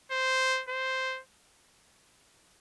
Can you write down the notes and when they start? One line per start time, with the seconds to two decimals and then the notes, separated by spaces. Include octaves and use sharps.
0.11 C5
0.69 C5